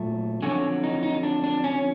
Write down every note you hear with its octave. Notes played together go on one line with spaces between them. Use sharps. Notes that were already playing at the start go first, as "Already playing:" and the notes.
Already playing: A#2 F#3 A3
F2 D3 F#3 C#4
D#4
D#4
D4
D4
C#4